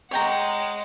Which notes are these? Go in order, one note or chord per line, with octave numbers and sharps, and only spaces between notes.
G#3 C#5 F#5 G5 A#5